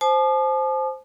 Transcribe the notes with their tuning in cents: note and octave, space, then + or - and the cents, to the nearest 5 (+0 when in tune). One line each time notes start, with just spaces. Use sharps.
C5 +0 A5 -40 D#6 -45